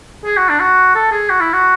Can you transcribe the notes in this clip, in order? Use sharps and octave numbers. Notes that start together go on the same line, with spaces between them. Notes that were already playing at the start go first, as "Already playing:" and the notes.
G#4
F#4
D4
F#4
A4
G#4
F#4
E4
F#4